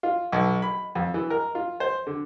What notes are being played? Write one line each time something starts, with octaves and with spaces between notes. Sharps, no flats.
F4
B1
B5
F2
E3
A#4
F4
C5
D3